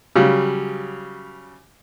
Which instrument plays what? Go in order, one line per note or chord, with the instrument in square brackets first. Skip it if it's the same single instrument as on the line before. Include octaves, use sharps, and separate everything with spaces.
[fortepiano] C#3 F#3 G3